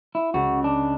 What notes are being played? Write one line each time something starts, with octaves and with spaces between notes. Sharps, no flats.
E4
C#2 F#4
D4